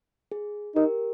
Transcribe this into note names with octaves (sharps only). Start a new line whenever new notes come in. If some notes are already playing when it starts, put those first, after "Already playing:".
G#4
D#4 G4 A#4